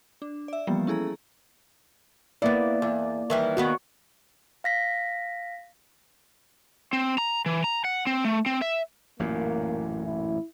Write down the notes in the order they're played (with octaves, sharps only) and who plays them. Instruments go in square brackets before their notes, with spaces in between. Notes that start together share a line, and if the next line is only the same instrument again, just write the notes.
[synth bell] D4
D5 E5
E3 F3 G3 A#3 B3
C#4 E4 G#4 A4 A#5
[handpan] A#3 D5 [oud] B3 E4
[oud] E2
D#3 E3 G3
[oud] D#2 D#3 B3 [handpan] F#4
[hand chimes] F5 A#6 B6
[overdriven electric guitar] C4
A#5
E3
A#5
F#5
C4
A3
C4
E5
[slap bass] A1 F#2 A#2 [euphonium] A#3
[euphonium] E4